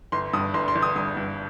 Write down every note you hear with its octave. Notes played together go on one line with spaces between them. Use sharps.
G1 C6
G2 D#6
G1 C6
C6
G1
D#6
G2 D#6
G2